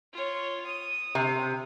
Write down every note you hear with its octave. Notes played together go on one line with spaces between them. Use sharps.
F4 C#5
D#6
C3